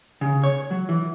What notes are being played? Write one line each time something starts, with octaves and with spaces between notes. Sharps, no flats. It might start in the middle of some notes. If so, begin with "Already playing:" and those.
C#3
C#5
F#3
E3